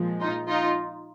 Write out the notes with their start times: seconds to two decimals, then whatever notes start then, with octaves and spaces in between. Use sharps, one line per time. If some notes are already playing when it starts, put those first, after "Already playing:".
Already playing: A#2 F3 G#3
0.20 D#4 F4
0.48 D#4 F4